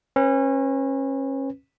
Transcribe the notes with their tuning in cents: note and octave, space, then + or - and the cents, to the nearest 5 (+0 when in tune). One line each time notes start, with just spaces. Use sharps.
C#4 -30 B4 +0